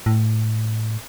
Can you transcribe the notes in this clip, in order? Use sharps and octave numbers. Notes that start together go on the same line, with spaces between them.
A2